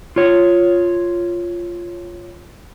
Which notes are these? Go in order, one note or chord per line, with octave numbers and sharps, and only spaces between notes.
F4 C#5